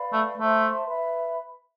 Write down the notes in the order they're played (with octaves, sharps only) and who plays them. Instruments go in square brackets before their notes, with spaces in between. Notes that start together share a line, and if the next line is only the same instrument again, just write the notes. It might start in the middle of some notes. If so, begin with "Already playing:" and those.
Already playing: [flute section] B4 D5 F5 B5
[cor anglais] A3
[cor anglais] A3 [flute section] C5 E5 A5 C6
[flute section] B4 E5 B5